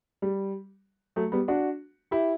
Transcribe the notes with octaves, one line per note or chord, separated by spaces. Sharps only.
G3
F#3 A3
G3 B3
D4 F#4
E4 G4